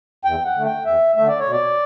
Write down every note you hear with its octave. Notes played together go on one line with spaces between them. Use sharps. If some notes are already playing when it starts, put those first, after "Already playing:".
E2 G5
F#5
D3 A3
G5
E2 E5
D3 A3 E5
D5
C#5
B2
D5